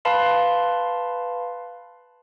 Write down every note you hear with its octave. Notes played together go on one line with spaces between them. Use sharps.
B4 F5 A5 B5 C6